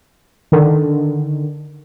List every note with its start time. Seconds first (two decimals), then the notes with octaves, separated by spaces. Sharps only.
0.52 D3 D#3